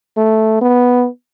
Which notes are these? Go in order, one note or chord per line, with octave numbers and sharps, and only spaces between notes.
A3
B3